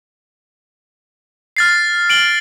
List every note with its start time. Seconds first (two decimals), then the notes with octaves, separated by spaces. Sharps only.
1.57 F6 A6 C7
2.10 D7 F#7 G7